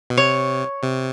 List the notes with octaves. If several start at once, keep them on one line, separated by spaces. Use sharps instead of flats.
B2
C3 C#5
C3